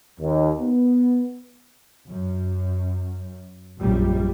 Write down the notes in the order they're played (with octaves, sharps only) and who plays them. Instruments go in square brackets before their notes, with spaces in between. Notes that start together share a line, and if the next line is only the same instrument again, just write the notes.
[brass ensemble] D#2
B3
[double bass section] F#2
A#1 F#2 G3